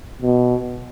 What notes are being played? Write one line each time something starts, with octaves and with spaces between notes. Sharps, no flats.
B2